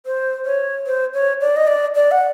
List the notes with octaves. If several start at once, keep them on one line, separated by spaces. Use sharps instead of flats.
C5
C#5
C5
C#5
D5
D#5
D5
D5
F#5